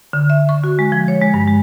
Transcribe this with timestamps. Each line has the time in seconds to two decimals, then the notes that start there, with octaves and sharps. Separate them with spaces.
0.13 D3
0.30 E5
0.49 C#6
0.64 F#4
0.79 G#3
0.92 F3
1.08 C#5
1.21 G#3
1.34 G2
1.47 G#3